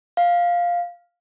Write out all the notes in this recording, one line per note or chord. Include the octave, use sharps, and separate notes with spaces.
F5